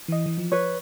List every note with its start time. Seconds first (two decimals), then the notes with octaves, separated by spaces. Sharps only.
0.08 E3 D#5
0.26 E3
0.38 F3
0.52 B4 C#5